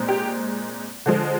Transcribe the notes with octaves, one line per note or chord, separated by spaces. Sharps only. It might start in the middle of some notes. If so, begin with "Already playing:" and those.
Already playing: A#2 G#3 C4
G4
D3 F3 G#3